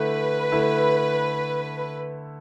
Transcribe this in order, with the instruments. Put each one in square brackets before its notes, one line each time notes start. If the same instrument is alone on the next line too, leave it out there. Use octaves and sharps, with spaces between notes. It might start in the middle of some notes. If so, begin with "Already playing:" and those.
Already playing: [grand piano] D3 A3 E4 [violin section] B4
[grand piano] D3 A3 E4